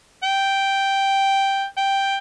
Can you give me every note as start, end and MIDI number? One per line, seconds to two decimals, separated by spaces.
0.23 1.64 79
1.77 2.17 79